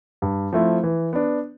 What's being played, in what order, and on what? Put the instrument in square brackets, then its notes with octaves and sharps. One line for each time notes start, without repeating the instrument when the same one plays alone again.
[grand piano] G2
F3 A3 C4 E4
E3
B3 D4